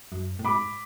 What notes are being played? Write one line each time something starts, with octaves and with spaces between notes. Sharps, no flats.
F#2
A2
G#2 B5 D6